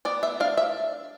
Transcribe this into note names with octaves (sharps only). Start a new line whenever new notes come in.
B3 D5
E5
D4 F5
E5